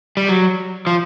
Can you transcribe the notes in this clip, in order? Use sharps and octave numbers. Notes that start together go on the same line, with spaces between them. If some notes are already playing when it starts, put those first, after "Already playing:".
G3
F#3
F3